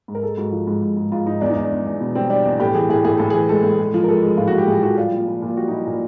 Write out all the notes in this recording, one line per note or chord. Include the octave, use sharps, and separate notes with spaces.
G#2
A#4
G#3 A4
G#2 F#4
F3
G#2
G#2
G#2
G#2 F4
G#2 D#4
E2 D4
D#4
E2 D4
E2
E2
B2
G3 C4
G3 D4
E2
A2 G4
E3 G#4
A2 G#4
A2 G#4
A2 A4
E3 G#4
G#3 A4
A2
G#3
F3
A#4
G#3 A4
G#3
A2 F4
F#4
A2 G4
A2 G#4
F3 F#4
G3 F4
A#2 F4
A#2
A#2
F4
G3 F#4
D#4
A#2 E4
A#2